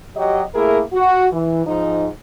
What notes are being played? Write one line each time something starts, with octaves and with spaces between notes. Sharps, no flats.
F#3 G4 D#5
A3 A#3 E4 G#4 A#4 E5
F#4
E3
G#2 F3 D#4